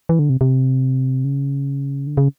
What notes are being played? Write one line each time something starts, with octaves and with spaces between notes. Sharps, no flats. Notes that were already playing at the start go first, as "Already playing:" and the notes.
E3
D3
C3
C3
C#3
D3
C#3